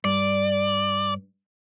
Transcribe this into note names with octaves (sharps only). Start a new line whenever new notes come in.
G2 D5